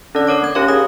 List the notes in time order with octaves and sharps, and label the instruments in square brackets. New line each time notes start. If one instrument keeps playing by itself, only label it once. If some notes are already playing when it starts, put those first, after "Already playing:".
[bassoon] D3 [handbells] C#4 D5
[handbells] A#4 C#5 D6
A#3 G#6
[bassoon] D#2 [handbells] C#4 G4 F5
[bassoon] C#3 [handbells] D#6